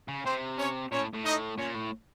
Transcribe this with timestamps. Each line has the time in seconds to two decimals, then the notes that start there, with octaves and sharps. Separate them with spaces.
0.08 C#3
0.25 C3 C4 C5
0.58 C#4 C#5
0.92 A#2 C#4 C#5
0.99 A2
1.14 A2
1.25 D#4 D#5
1.58 A#2 C#4 C#5
1.75 A2